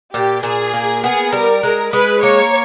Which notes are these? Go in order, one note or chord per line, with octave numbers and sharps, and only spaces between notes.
A#2 G4
A#2 G#4
A#3
B3 G#4
G3 A#4
G#3 A#4
G#3 B4
A#3 C#5